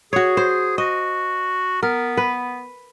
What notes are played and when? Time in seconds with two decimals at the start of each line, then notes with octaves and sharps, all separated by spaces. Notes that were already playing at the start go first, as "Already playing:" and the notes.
0.13 F#4 G#4 C#5
0.37 C5
0.78 F#4 D#5
1.83 B3 A#4
2.17 B4